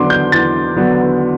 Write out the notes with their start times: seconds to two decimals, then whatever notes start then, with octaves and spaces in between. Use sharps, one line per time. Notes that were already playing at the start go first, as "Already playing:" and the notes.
Already playing: E2 D3 F#3 B3 D4 C6 D6
0.10 G6
0.32 E2 A6
0.76 D3 F#3 B3 D4